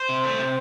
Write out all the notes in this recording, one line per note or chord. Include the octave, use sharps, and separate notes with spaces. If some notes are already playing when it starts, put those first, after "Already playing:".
Already playing: C5
C3
A3
C3